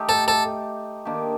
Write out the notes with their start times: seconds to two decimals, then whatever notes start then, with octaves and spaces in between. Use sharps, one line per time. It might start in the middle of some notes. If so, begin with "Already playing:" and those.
Already playing: A3 D#4 G4
0.09 A4
0.28 A4
1.05 D#3 A#3 D4 G4